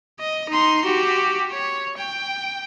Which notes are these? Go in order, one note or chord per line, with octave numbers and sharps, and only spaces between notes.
D#5
D#4 C6
F#4 G4
C#5
G5